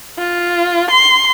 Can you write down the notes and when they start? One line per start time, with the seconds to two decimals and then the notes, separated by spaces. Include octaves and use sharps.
0.18 F4
0.91 C6